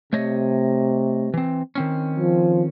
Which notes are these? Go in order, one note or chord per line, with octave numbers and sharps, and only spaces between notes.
C3 A3 C#5 D#5
E3 C4
D#3 C4 C#4
F3